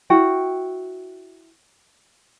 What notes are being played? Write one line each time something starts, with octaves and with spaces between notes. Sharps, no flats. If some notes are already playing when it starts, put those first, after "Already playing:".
E4 F#4 G5